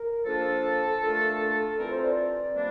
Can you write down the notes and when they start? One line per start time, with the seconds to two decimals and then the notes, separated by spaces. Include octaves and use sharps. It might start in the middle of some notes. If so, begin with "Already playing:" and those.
Already playing: A#4
0.26 F3 A#3 D4 F4 A4
1.02 A#2 A3 D4 F4
1.77 E3 G3 C4 F4 A#4
1.90 C5
2.02 D5
2.54 C3 G3 A#3 D4